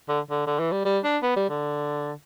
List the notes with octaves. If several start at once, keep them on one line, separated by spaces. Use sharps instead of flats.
D3
D3
D3
E3
G3
G3
D4
B3
G3
D3